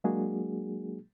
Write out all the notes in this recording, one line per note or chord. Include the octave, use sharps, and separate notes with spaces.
F#3 G#3 A#3 D4 F#4 G#4